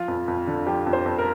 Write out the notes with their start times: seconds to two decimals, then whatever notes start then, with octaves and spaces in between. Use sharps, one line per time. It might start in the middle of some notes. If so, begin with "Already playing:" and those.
Already playing: F3 F4
0.08 F2
0.28 F2
0.47 D3
0.66 F3 G4
0.87 F2
0.93 C5
1.06 F2
1.18 A#4